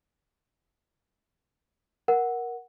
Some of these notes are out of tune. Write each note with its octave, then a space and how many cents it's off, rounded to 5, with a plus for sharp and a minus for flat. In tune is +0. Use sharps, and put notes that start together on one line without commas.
A#4 +15 F#5 +0